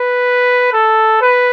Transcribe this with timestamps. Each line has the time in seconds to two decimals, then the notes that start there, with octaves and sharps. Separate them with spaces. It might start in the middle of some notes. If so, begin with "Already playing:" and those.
Already playing: B4
0.73 A4
1.21 B4